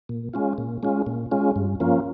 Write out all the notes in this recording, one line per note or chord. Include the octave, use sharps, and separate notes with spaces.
A#2
G#3 C#4 F4
A#2
G#3 C#4 F4
A#2
G#3 C#4 F4
G2
F3 A#3 C#4 F4